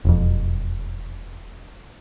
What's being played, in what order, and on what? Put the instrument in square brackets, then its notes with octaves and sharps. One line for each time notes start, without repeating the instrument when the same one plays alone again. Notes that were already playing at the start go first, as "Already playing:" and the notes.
[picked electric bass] E1 F2